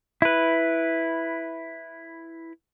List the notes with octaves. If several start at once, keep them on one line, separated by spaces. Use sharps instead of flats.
E4 B4